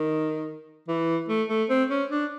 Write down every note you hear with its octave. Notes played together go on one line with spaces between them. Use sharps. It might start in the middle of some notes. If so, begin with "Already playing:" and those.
Already playing: D#3
E3
A3
A3
C4
C#4
D4